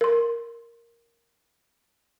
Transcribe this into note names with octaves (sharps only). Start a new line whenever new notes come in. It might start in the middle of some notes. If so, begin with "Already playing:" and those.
A#4 C6